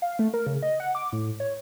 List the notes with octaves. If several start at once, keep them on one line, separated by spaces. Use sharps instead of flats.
F5
A3
A#4
C#3
D#5
F#5
D6
A2
C#5